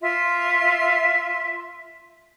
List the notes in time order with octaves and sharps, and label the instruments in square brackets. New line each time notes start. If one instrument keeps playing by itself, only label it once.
[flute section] F4 E5 C6